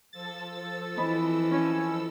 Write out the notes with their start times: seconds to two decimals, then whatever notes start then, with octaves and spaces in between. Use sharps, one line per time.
0.13 F3 A4 E6 A6
0.97 E3 C4 D#5 B5
1.51 C#4